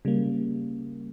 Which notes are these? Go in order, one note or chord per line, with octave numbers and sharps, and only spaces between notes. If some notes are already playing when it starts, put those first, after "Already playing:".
C#3 G3 A#3